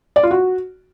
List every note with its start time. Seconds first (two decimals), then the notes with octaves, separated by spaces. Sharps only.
0.16 D5
0.23 F4
0.31 F#4